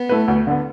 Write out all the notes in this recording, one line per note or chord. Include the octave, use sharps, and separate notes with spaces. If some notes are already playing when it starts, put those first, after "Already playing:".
Already playing: B3
A3 E4 B4
D2
D3 B3